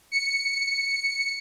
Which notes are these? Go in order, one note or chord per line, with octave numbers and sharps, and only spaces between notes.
C#7